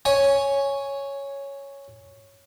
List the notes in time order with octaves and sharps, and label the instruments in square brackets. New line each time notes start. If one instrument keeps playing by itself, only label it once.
[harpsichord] C#5 G#5